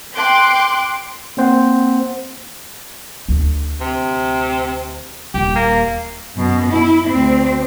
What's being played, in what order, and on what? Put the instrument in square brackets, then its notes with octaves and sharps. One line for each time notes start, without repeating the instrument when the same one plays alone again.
[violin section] G5 C6 D6 F#6
[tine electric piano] A#3 C4 C5 F#5
[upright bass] D2
[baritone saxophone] C3
[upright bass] D#1 [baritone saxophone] G4
[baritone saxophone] A#3
[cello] F#2 B2
E4
D2 C4